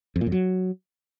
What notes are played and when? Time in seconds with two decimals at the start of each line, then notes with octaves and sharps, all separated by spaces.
0.16 F2
0.21 A#2
0.27 F2
0.32 F#3